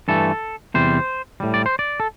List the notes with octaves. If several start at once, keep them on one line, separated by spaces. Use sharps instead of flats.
G2 E3 A3 A4
E2 C3 G3 C5
A2 G3
D5
C5
D5
A4